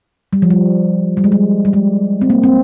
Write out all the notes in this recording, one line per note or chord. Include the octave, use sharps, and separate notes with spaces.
G3
F3
G3
G3
G#3
G3
G3
G#3
C4
A#3
C4